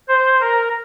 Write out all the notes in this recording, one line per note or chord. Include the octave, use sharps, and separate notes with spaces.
C5
A#4